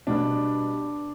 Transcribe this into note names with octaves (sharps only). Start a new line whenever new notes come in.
B2 G3 B3 D4